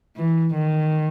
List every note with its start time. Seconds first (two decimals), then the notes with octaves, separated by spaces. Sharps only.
0.17 E3
0.55 D#3